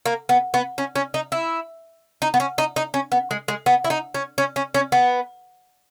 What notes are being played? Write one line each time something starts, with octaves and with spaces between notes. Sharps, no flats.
A#3
B3
B3
C#4
C#4
D#4
E4
D#4
B3
C#4
D#4
D#4
C#4
B3
G#3
G#3
B3
E4
D#4
C#4
C#4
C#4
C#4
B3